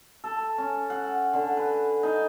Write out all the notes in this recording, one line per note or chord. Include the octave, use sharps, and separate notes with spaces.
A4
C#4
F#5
D3
B4
D#4